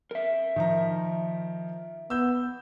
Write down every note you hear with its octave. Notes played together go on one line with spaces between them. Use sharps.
A#4 E5
D#3 F3 A#5
B3 E6 G6